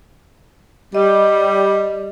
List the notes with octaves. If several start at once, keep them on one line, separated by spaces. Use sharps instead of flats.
G3 D#5